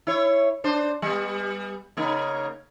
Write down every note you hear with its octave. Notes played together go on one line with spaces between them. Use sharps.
E4 C#5
D4 C5
G3 B3
C#3 A#3 D#4